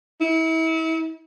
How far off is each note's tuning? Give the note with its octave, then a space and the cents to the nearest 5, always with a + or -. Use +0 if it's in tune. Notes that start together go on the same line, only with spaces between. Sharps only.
E4 -35